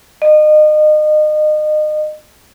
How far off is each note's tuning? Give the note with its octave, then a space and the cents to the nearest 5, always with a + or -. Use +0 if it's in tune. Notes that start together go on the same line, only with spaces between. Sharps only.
D#5 -30